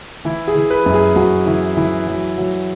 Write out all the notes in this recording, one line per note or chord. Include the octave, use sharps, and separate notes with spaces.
E3 E4
G#4
E3
B4
F#2
G#4
F#2 F#4
E3 E4
E3 E4
F#3
F#3